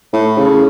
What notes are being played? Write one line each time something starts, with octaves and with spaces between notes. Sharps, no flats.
A2
C#3